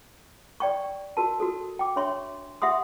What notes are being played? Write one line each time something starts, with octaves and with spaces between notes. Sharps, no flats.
D5 G5 C#6
F#4 A#4 A5
F#4 A4
G5 D6
D4 C#5 E5 C6 C#6
G4 E5 F#5 C6 D#6